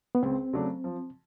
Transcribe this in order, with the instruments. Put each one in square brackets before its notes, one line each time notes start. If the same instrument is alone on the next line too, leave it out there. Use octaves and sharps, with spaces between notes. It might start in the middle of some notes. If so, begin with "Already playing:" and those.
[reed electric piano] B3
[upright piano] C#2 [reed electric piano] C4
[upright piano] C#3 F#3 A3 D4
F3